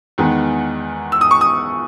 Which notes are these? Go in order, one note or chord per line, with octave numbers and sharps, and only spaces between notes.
E2 D#3 G#3 B3 D#4
E6
D#6
C#6
D#6